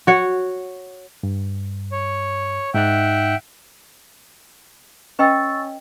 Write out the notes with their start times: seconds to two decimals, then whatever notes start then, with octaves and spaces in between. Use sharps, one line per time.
0.07 F#4 C#5 F#5
1.23 G2
1.92 C#5
2.74 G#2 D#4 E5 F#5 G5 F#6
5.19 C#4 B4 D#5 G5 C#6 E6 A6